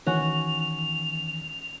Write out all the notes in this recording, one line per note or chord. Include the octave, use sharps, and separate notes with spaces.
D#3 E3 C#4 F#4 G#5 F7